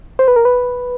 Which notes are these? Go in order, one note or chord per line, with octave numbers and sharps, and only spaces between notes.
C5
B4
A#4
B4